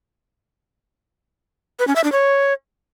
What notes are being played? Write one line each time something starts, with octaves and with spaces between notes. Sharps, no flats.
B4
C#4
E5
D4
C#5